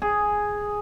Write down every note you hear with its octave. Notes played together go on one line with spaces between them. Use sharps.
G#4